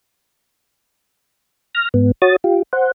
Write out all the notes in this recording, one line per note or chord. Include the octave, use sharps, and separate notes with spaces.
F6 A#6
G#2 B3
F#4 C#5 D#6 A6
F4 G4
C5 F#5